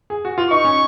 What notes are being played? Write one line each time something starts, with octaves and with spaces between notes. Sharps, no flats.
G#4
F#4
F4
D#4 C#6
C#4